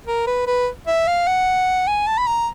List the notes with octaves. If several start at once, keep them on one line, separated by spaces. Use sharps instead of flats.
A#4
B4
B4
E5
F5
F#5
G#5
A5
B5
A#5